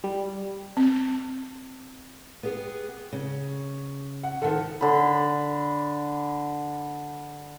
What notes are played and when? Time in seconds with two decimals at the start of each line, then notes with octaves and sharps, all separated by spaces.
0.04 G3
0.77 C4
2.43 B3 G4 G#4
3.13 C#3
4.23 F#5
4.42 D#3 F3 A4 F#5
4.81 D3 B5